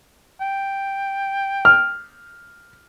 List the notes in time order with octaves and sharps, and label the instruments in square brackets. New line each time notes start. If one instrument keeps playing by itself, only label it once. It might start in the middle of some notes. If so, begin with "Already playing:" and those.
[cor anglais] G5
[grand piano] F6